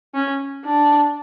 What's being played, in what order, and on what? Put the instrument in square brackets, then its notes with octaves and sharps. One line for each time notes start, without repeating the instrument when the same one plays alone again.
[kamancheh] C#4
D4